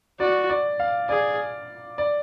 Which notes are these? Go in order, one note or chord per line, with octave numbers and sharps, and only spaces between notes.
F#4 D5
D5
F5
G#4 D5
D5